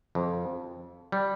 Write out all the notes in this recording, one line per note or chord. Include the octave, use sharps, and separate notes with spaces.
F2
G3